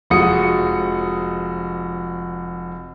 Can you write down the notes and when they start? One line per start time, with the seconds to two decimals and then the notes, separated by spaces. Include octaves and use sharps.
0.10 F1 F3 G#3 F#4 D#6 C#7